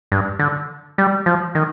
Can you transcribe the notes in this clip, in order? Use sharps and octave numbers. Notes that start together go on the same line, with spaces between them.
G2
D3
G3
F3
D#3